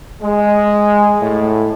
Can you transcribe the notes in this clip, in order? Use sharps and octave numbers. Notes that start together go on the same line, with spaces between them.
G#3
A2